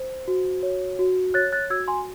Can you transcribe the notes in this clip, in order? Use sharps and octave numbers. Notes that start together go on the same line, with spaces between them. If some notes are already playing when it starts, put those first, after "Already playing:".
Already playing: C5
F#4
C#5
F#4
C#5 F#6 A6
F#6 A6
F#4 E6 G#6
G#5 C6